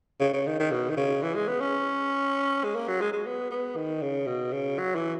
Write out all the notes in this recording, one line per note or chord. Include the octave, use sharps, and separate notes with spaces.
C#3
C#3
D#3
D#3
B2
D#3
C#3
E3
G#3
B3
C#4
G#3
A#3
F#3
G#3
G#3
B3
B3
D#3
C#3
B2
C#3
F#3
E3